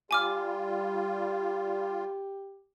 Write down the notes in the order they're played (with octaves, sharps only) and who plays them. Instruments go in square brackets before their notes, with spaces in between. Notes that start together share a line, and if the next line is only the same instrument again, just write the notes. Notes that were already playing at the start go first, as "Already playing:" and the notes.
[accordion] G3 F4 [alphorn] G4 [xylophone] G#5 D6 F6